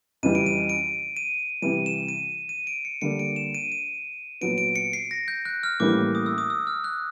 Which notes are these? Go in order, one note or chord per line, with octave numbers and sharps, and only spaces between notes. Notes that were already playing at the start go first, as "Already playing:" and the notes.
F2 C#3 E3 G3 D#7
D7
D#7
D7
D#7
C3 E3 G3 D#7
E7
D#7
D#7
D7
C#7
D3 G3 A#3 D4 C#7
D7
E7
D#7
D#7
A#2 F#3 B3 D7
D7
C#7
C7
A#6
G6
F#6
F6
A2 E3 G3 A#3 C#4 D6
D#6
E6
D#6
E6
F6
F#6